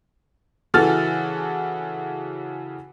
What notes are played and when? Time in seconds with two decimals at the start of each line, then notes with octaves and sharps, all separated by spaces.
0.74 C#3 E3 F#4 A4 F6 A6